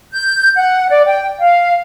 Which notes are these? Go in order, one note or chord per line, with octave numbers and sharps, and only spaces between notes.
G6
F#5
D5
G5
F5